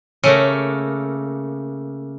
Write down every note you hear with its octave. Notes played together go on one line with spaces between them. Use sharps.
C#3 A3 A#3